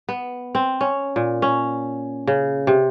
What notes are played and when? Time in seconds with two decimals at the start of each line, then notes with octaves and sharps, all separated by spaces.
0.09 B3
0.55 C4
0.81 C#4
1.16 A#2
1.42 C#4
2.27 C#3
2.67 C3